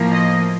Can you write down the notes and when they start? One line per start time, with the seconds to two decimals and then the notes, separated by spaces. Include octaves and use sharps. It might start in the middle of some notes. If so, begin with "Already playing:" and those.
Already playing: A2 F3 A#3
0.11 D#5